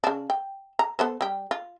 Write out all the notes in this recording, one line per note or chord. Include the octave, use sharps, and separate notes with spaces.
C#3 D4
G5
A#5
B3 A4 C5
G3 G4
F4